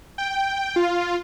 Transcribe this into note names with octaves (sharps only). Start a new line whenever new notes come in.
G5
F4